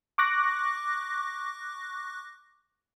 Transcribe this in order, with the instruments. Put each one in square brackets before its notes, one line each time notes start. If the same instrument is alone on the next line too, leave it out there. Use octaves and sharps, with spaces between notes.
[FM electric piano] C#6 D6 F#6 A#6